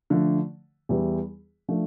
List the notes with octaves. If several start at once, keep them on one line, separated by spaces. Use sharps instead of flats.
D3 F3 A3
E2 E3 G3
F3 A3 D4